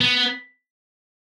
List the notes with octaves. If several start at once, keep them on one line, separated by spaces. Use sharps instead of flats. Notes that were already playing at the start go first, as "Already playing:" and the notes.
B3